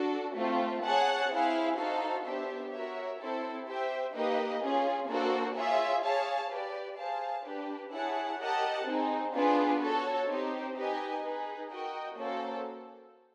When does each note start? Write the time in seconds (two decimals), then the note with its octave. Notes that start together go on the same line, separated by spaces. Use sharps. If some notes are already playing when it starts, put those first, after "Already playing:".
Already playing: D4 F#4 A4
0.35 A3 C4 F4
0.83 G#4 C#5 F#5 A5
1.30 C4 E4 G#4 C5 F5
1.77 D#4 F#4 A4 C5 F5
2.24 B3 D4 G4 C5 E5
2.72 F#4 A#4 C#5 E5
3.19 C4 E4 A4 C5
3.66 G4 C5 E5 G5
4.14 A#3 D#4 G4 B4 D#5
4.61 C#4 F4 G#4
5.09 A#3 D4 F#4 A4 C5
5.55 F4 G#4 C#5 E5
6.02 G#4 C#5 F5 A5
6.50 G4 B4 D5
6.97 G#4 C5 F5 A5
7.45 D4 G4 B4
7.91 E4 G#4 C#5 F#5 A5
8.39 G4 A#4 D#5 F#5 A5
8.86 C4 D#4 G#4
9.33 B3 D4 F4 G#4 B4
9.80 F#4 A4 C#5
10.28 C4 D#4 G4 C5
10.75 D#4 G4 B4 D#5 G#5
11.23 D#4 G#4 B4
11.70 F#4 A#4 D#5 G5
12.17 A#3 C#4 F#4 A4 C5